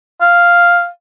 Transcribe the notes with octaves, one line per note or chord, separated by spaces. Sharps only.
F5